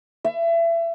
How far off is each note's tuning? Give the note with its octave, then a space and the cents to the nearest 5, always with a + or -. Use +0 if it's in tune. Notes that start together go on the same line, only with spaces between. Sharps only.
E5 +30